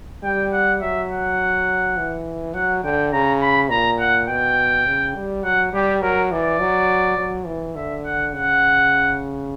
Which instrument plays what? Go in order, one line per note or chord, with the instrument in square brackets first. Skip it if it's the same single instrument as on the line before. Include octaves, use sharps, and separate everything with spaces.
[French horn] G3 [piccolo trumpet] G5
[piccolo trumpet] F#5
[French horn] F#3 [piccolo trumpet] E5
[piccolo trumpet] F#5
[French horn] E3
[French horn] F#3 [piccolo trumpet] F#5
[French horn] D3 [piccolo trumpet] G5
[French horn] C#3 [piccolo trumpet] A#5
[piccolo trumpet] B5
[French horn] A#2 [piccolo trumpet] A#5
[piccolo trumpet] F#5
[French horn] B2 [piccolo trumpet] G5
[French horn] C#3
G3
[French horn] F#3 [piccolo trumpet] F#5
[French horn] G3 [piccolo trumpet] G4
[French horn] F#3 [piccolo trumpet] A#4
[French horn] E3 [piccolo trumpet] D5
[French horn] F#3
F#3
E3
[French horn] D3 [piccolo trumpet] E5
[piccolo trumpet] F#5
[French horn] C#3 [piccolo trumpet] F#5